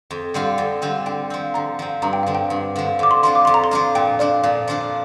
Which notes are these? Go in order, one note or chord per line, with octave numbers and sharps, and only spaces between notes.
F2
D3 G3 C4 F4
F2
D3 G3 C4 F4
D3 G5
F3 C4
D3 A#5
F3 C4
G2 A#5
G5
D3 F3 F5
G5
G2
D3 F3
F2 D6
C6
F3 D4 F4 C6
D6
F2 C6
A#5
C6
F3 D4 F4
A#2 G5
F3 D4 F4 D5
A#2 F5
F3 D4 F4